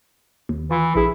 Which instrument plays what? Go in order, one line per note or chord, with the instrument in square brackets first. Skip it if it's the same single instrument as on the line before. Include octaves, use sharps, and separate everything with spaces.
[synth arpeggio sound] D#2
[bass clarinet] E3 [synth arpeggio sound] F4
[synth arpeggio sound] A#1 G#4 [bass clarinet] E4